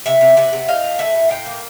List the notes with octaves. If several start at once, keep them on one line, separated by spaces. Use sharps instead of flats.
C3 E5 F#5
C3
C3 E5 F#5
C3
A2 D#5 F5
A3
A3 E5 F#5
A2
A2 F5 G5
A#3